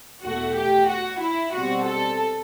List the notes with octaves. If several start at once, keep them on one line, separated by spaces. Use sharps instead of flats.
E2 B2 A3 F#4
G4
F#4
E4
B2 G3 C4 F#4
A4